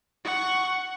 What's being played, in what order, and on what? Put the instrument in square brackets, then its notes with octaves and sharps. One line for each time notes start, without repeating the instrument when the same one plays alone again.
[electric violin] F#5 C#6